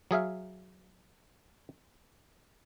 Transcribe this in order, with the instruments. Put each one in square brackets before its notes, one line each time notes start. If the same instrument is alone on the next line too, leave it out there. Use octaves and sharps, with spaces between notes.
[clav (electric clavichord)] F#3 G#4 E5 F5